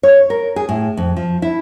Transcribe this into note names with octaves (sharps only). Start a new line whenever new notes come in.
C#5
A#4
G#4
A2
F2
F3
E4